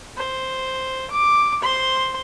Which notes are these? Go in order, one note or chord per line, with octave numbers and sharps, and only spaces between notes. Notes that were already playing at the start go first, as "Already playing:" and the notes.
C5
D6
C5 C6